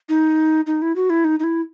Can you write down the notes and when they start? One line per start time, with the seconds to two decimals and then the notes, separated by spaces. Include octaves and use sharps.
0.09 D#4
0.66 D#4
0.82 E4
0.96 F#4
1.10 E4
1.24 D#4
1.39 D#4
1.44 E4